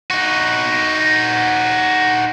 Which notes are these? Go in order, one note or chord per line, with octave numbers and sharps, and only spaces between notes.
D#4 F#4